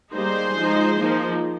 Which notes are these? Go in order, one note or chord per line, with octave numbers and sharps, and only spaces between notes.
G3 A#3 D#4 G#4 C5
F3 G#3 D#4
F3 A#3 D#4